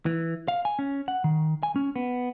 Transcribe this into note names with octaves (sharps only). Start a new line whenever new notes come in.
E3
F5
G#5
C#4
F#5
D#3
G#5
C#4
B3